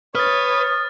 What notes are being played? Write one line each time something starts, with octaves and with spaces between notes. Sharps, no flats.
B4 C#5 D#6 F6 A6